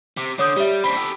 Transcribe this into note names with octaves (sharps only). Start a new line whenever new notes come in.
C3
D3 C#5 D#6 G6
G3 G4 E5
C4 D4 B5 B6
G4 A4